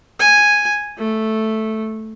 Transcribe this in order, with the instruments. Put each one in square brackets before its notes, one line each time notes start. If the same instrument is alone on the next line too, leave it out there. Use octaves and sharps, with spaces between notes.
[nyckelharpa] G#5
A3